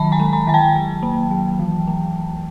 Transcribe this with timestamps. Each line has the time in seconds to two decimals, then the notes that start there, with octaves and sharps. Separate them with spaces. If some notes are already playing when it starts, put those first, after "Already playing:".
Already playing: D#3 F#3 A5 B5
0.12 G#5 A#5
0.20 G#3
0.33 G#5 A#5
0.47 D#3 G#5
0.54 G5 A5
0.76 F#3
1.03 A#3
1.31 F#3
1.59 E3
1.87 A3